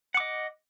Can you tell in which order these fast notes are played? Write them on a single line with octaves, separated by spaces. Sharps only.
F#5 D6 D#5